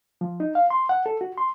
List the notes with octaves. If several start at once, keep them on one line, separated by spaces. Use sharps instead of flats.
F3
D#4
F5
C6
F#5
A4
F#4
C6